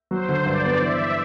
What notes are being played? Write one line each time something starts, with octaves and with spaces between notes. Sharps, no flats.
F#3 C5
D3
G2 D5
B3
E3 E5